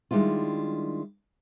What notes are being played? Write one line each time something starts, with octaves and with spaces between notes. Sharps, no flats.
D#3 G3 G#3 D4 E4 F4